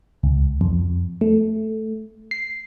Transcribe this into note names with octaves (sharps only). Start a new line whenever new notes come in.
C#2
F2
A3
C7